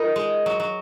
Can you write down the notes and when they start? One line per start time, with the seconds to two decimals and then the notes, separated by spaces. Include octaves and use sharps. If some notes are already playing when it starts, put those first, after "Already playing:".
Already playing: D#4 F4 A#4
0.16 G#3
0.46 F#3
0.60 F#3